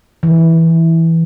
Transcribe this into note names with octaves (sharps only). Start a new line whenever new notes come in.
E3